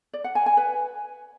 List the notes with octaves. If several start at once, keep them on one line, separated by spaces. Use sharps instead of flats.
D5
F#5
G#5
G#5
B4